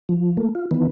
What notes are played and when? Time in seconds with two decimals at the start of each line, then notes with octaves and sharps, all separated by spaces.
0.09 F3
0.37 A3 A#3
0.55 F4
0.71 D#3 E3 B3